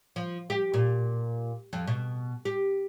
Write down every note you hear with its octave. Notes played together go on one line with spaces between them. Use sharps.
F3
G4
A#2
F2
B2
G4